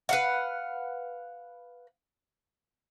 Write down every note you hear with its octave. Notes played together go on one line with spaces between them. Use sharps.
B4 F5 F#5